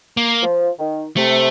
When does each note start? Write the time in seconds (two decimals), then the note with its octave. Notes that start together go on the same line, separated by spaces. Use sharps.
0.17 A#3
0.43 F3
0.79 D#3
1.16 C3 A3